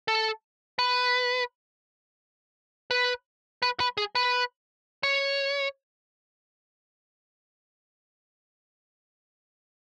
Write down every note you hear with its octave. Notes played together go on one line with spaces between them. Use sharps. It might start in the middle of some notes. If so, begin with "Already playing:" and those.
A4
B4
B4
B4
B4
G#4
B4
C#5